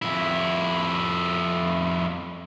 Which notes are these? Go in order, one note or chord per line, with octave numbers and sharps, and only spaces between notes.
F2 E4